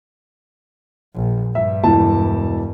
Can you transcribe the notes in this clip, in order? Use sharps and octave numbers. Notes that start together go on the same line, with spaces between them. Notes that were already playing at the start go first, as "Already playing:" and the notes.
A#1
G2 E5
E1 E4 A5